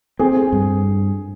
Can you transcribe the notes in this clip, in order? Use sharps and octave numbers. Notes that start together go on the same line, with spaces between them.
C4 G#4
G2